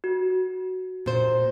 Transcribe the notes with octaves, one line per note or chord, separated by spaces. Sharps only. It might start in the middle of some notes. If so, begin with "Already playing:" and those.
F#4
A#2 C5